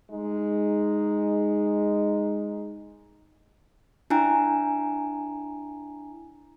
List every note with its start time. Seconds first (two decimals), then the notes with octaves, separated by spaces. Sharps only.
0.11 G#3 D#4
4.10 D4 E4 G5 G#5 A#5